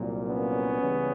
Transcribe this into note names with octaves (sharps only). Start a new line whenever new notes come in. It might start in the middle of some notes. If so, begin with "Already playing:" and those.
Already playing: C2 A#2 F#3 A#3
B3 C#4
C#2 C#3 E3 G3